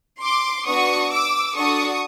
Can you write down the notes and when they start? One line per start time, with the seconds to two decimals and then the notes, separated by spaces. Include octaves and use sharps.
0.21 C6 D6
0.66 B3 D4 F#4 C#6 D#6
1.11 D6 E6
1.56 D4 F#4 A4 C#6 D#6